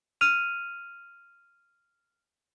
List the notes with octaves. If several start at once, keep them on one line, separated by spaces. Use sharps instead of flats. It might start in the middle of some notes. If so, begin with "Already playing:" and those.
F6 D#7 F7